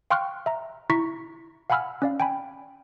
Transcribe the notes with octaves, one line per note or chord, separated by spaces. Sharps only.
F5 G5 C6 C#6 F6 F#6
E5 A#5
E4 A#5 C#6 B6
F5 F#5 G#5 B5 E6 F6
C#4 D5 F5
G5 G#5 B5